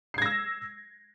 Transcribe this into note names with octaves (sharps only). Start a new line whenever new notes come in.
E6 G#6 A#6 C7